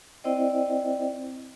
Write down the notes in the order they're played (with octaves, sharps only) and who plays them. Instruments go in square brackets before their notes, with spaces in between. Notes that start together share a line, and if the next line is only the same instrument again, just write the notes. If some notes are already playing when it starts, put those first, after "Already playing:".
[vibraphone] C4 E4 C5 D5 D#5 G5